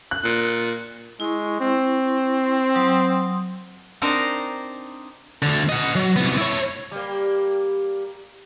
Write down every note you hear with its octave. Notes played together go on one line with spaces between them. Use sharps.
F#6
A#2
G#3 E4 C#6
C4
F#3 C6 D#6
C4 D4 D#4 A#4 C5
D2 D3
D#5 F#5
F#3
C2 B3
E4 C#5
G3 A#3